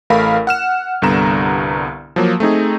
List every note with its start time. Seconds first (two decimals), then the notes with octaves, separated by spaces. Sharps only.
0.10 A1 A3 A#4 F5 B5
0.47 F#5 F6 E7
1.02 C2 G2 D3 B3 A#5 E7
2.16 F3 F#3 A#3
2.40 A3 C4 D#4 G#4